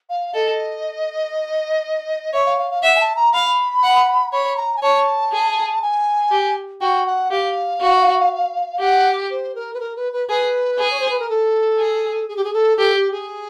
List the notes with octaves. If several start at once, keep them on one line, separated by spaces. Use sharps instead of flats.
F5
A4 D#5
C#5 E5
F5
F5
F5
E5 F#5
G#5
A5
A#5
F5 B5
F#5
C#5 B5
A#5
G#5
C#5 A5
G#4
G#5
G4
F#4 G5
F#5
G4 F5
F#4
G4 F#5
C5
A#4
B4
A#4
B4
B4
G#4 B4
G#4
C#5
C5
B4
A#4
A4
G#4
G#4
G4
G#4
A4
G4 A4
G4
G#4